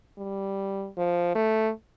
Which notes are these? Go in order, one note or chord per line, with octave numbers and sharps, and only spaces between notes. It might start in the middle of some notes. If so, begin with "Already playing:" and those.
G3
F3
A3